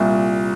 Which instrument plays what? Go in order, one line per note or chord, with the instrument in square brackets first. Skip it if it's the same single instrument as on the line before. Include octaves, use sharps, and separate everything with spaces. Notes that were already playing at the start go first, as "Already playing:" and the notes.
Already playing: [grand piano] C2 A#2